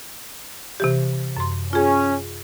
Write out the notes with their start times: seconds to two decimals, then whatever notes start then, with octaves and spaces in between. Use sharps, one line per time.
0.80 C3 E3 G4
1.37 F#2 C6
1.73 C#4 F4 G#4